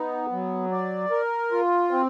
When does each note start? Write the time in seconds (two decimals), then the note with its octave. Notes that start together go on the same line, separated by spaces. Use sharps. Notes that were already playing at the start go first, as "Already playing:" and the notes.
Already playing: B3 D#4
0.32 F#3
0.71 D5
1.11 A#4
1.52 F4
1.91 C4